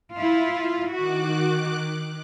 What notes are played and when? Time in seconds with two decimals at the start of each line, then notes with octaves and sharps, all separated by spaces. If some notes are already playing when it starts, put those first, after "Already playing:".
0.17 E4 F4
0.93 D#3 F#4 D6 F#6